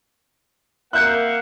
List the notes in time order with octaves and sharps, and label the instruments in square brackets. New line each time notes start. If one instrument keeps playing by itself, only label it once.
[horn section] A#3 E5 F#5 [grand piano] F#6 G6 C#7